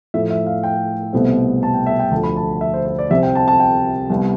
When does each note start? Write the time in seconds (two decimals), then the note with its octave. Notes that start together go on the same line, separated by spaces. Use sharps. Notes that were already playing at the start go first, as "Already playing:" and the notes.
0.14 A2 F3 A3 E5
0.30 E5
0.47 F5
0.63 G5
1.13 C2 B2 A3 C4
1.63 A5
1.74 G5
1.86 E5
1.99 G5
2.11 D2 D3 F3 A5
2.24 B5
2.36 A5
2.61 E5
2.74 C5
2.86 C5
2.99 D5
3.10 C2 C3 G3 C4 E5
3.23 G5
3.35 A5
3.48 A5
3.60 G5
4.10 C2 C3 G3 B3